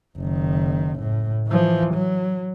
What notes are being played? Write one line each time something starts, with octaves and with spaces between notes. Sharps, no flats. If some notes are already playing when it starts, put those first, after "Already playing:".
F#1 D#3
A2
E3 F3
F#3